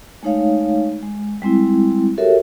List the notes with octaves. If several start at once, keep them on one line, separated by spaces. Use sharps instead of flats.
G#3 A3 D#4 C#5 F5
G#3
G3 G#3 C4 E4
F#4 G4 A4 A#4 C#5 E5